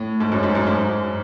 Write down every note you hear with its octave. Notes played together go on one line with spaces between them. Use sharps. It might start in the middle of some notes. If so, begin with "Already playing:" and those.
Already playing: A2
G#2
F#2
G#2
F#2
G#2